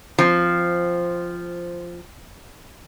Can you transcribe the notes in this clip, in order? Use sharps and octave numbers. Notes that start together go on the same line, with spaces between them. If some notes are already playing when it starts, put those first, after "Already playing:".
F3 C4